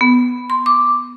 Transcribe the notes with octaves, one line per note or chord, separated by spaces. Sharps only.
B3
C6
D6